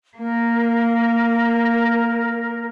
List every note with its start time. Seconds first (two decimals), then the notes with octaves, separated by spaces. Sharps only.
0.18 A#3 A#4